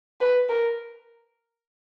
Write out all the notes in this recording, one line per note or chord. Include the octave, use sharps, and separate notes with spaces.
B4
A#4